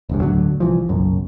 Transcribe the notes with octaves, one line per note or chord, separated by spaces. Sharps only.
E1 C#2 G2
D2 A2 D3 F#3
C2 E3 F3
F#1 B1 F#2